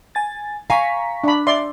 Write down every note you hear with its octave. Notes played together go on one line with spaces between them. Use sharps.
G#5 A6
F5 G#5 A#5 C#6 B6
D4 B5
D5 E5 C6